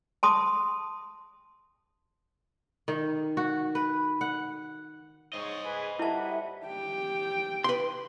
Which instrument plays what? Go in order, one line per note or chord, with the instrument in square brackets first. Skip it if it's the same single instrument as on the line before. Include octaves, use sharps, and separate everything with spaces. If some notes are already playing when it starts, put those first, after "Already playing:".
[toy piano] A5 C6 D#6
[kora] D#3
F#4
B4
F#5
[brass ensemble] G#2 C4 C#5 [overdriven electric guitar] C5 D#5
[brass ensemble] G#4 B4
[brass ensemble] G3 B4 F#5 [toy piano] E4 A5 [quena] E5
[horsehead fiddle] G4 G5
[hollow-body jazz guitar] B4 C6